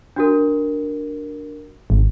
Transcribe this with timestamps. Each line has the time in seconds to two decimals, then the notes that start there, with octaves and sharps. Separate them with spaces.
0.16 D4 F#4 A#4
1.90 G#1